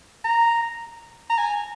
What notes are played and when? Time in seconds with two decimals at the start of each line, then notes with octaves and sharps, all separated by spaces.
0.25 A#5
1.30 A#5
1.38 G#5